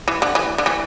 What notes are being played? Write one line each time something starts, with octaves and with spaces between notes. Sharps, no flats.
E3
D3
E3
D3
E3